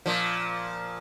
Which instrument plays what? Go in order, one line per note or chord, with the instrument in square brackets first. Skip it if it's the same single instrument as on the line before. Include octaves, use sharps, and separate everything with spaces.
[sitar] A#2 F3